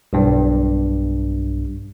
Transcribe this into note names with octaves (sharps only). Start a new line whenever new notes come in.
B1 G2